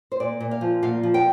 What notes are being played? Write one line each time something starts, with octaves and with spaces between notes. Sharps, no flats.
C5
A#2 D5
A#2
F5
F3
A#2 F5
F3
G5